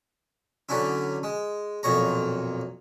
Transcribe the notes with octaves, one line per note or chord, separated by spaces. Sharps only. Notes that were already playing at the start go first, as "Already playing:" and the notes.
D3 F#3 C#4 D4 E4
G#3
B1 F2 A#2 C#5 A#5